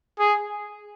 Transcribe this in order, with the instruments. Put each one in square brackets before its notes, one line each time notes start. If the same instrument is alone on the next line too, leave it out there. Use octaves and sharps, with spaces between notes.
[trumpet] G#4